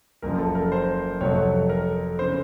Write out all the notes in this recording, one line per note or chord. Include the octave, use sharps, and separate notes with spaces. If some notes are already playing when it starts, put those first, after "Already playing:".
F#1 F#2 C#3 F3 A#4
A4
A#4
C5
F2 C3 F#3 A3 C#5
A#4
C#3 C5